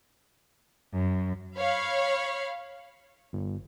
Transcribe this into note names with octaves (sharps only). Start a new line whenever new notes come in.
F#2
C#5 F5 B5
G1